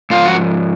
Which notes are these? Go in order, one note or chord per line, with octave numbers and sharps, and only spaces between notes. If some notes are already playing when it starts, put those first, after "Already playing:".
G#2 F3 F4
F#4